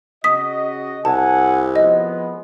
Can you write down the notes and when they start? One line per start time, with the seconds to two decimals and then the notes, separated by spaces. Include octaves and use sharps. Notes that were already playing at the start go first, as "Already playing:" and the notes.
0.24 C#3 F#4 D#5 D#6 B6
1.05 C2 F#5 G#5 A5
1.76 F3 G#3 B3 D#5